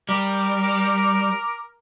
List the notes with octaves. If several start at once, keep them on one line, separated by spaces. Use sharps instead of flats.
G3 A#4 D6